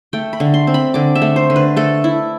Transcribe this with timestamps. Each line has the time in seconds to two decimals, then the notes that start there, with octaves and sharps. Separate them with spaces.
0.13 A3 G5
0.33 B5
0.40 D3
0.54 C6
0.67 C4
0.74 B5
0.94 D3 D6
1.15 E5
1.22 A3
1.36 C5
1.50 D3
1.56 B4
1.76 A3 A4
2.04 E4